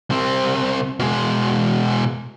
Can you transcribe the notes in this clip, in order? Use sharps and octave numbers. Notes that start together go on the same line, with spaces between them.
C2 C4
B2 G#3